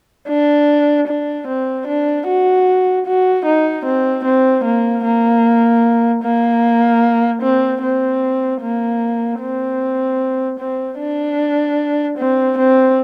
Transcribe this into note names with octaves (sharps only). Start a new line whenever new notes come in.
D4
D4
C4
D4
F#4
F#4
D#4
C4
C4
A#3
A#3
A#3
C4
C4
A#3
C4
C4
D4
C4
C4